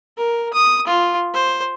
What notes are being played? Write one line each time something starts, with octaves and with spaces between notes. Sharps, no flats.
A#4
D#6
F4
C5